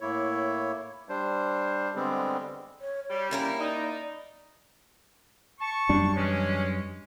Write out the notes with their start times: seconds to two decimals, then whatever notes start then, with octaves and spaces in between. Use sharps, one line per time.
0.01 A2 A#3 E4 C#5
1.09 G3 D4 C5
1.95 D3 G3 G#3 B3 C4
2.81 C#5
3.10 G3 C#5
3.31 A#3 C#4 E4 A#4
3.59 D#4 D5
5.60 A5 C#6
5.89 F#2 G3 D4
6.16 E3 G#3 C#4